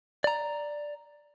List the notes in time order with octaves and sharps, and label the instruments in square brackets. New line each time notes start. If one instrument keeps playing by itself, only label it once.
[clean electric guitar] D5 A#5